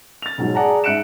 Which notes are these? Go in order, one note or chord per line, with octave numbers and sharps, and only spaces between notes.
A6 F7
B1 G#2 F#3
G#4 D5 F#5 A5 A#5
G#2 E5 F#6 C#7 D7 E7